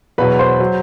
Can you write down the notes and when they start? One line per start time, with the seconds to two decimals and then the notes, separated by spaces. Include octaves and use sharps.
0.18 E2 B2 F#3 B4 B5
0.39 C5 C6
0.60 F#3